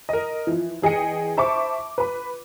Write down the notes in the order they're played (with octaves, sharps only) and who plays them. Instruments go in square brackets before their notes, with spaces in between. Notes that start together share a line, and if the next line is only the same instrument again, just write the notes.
[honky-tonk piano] A#4 D#5
E3 F3
E2 G#4 D#5 G5 C#7
C5 E5 A5 B5 C#6 D6
B4 B5